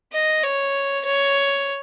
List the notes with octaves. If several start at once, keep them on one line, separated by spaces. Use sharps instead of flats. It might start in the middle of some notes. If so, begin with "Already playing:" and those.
D#5
C#5
C#5